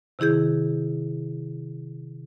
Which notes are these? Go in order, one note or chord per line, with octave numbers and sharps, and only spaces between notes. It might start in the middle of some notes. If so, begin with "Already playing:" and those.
C3 D#3 E4 G#4 G6